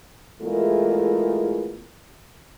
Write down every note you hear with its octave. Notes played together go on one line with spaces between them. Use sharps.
E2 G#3 A3 E4 F4 A#4